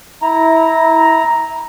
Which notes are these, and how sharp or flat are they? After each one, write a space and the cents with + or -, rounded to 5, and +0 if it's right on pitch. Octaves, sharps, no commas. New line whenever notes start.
E4 -20 A#5 +0